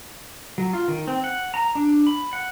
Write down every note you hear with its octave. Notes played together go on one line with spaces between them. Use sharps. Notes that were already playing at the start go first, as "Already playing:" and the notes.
F#3
F4
D#3
C4
F#5
A#5
D4
B5
F#5